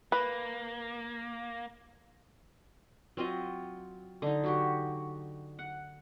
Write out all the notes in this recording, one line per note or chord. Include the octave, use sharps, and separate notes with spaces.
A#3 B4
F#3 C4 F4 D#5
D3 D#4
F#3 F#4 G4
F#5